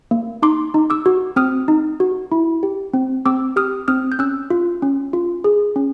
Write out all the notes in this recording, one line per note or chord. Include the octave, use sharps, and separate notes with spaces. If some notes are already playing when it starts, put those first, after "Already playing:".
A#3
D#4 C6 D6
D#4
D6 E6
F#4
C4 D#6 F6
D#4
F#4
E4
G4
C4
C4 D6 E6
G4 D#6 F6
C4 D#6 F6
G6
C#4 E6 F#6
F4
C#4
F4
G#4
C#4